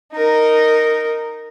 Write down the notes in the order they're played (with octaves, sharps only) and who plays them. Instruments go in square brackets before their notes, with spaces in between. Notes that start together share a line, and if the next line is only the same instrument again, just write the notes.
[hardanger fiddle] D#4 A#4